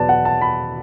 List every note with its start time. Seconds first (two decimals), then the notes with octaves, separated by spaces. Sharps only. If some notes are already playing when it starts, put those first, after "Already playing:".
Already playing: E2 B2 F#3 B4 D5 A5
0.09 F#5
0.25 A5
0.41 B5